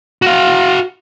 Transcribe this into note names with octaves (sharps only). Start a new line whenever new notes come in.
F#4 F5